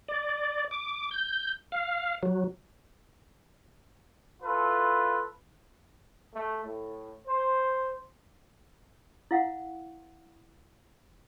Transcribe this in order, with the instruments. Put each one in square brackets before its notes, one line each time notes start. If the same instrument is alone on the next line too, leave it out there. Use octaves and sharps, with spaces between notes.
[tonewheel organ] D5
D6
G6
F5
F#3
[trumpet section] E4 F4 A4 B4
[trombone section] A3
A2
C5
[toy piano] E4 F5 F#5